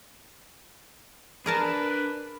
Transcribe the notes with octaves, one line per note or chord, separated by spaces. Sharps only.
D4 G#4 A#4 B4 A5